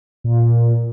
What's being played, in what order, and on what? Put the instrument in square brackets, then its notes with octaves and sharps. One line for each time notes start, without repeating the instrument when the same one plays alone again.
[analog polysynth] A#2